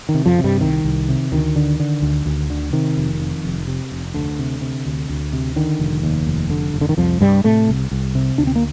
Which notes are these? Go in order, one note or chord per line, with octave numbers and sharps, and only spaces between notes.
D#3
C3
F2 F3
C3
G2 G3
C2 D#3
C2
C3
D2 D#3
D3
D3
D2
D2
D3
C3 D#3
F1
F2
F1
C3
F1
D2 D3
C3
C3
D2
D2
C3
D3 D#3
F1
D#2
F1
D3
F1
D3
D#3
C2 F2 F3
G2 C3 G3
A2 C3 A3
C2
C2
C3
D2 D4
C4
A#3